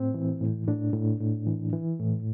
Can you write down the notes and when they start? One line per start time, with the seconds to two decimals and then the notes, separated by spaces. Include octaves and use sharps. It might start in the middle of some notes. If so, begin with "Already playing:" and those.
Already playing: A2 C4
0.14 E3
0.41 A2
0.67 A2 D4
0.93 A2
1.20 A2
1.47 E3
1.73 E3
1.99 A2